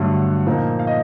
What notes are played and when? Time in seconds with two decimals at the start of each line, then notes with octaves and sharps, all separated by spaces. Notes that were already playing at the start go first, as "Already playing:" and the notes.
Already playing: G2 D3 F#3 A3 F#5
0.46 A#2 F3 A#3 D#4
0.79 F5
0.87 D#5